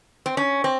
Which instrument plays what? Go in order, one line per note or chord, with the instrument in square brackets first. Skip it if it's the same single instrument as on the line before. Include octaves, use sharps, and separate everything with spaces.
[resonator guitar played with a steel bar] C4
C#4
C4